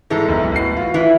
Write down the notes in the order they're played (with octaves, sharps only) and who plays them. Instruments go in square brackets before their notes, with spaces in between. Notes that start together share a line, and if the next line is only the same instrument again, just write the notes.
[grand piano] G#2 G#3 A4 [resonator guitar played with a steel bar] E3
[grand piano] F#1 B1 G#2
A1 F#4 C7
F4 F#4
[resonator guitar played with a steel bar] E3